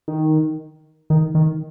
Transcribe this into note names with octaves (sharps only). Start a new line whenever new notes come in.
D#3
D#3
D#3